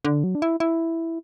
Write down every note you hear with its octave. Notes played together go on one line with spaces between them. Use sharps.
D3
F#3
D4
E4
E4